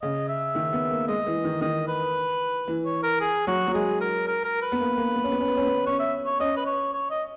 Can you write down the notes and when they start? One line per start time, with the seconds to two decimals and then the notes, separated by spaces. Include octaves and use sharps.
0.02 C#3 D#5
0.29 E5
0.55 D#3
0.73 B3
0.91 A#3
1.08 G#3 D#5
1.27 E3
1.44 D#3
1.61 D#3 D#5
1.88 B4
2.68 E3
2.85 C#5
3.03 A#4
3.21 G#4
3.47 F#3 F#4
3.67 F#3
3.74 G#3 G#4
4.01 A#4
4.27 A#4
4.44 A#4
4.62 B4
4.72 B3
4.80 A#3
4.97 A#3
5.15 B3
5.24 C#4
5.32 B3
5.40 C#4
5.48 B3
5.57 C#4
5.65 B3
5.86 C#4 C#5
5.99 E5
6.26 C#5
6.40 C#4 D#5
6.57 B4
6.66 C#5
6.93 C#5
7.10 D#5